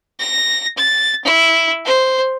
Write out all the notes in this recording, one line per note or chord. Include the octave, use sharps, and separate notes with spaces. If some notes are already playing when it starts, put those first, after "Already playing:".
A#6
A6
E4
C5